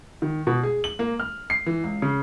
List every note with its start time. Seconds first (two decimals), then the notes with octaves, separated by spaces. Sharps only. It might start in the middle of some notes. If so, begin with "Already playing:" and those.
0.22 D#3
0.47 B2
0.63 G#4
0.84 F#7
0.99 A#3
1.19 F6
1.50 C7
1.66 E3
1.84 C#2
2.02 C#3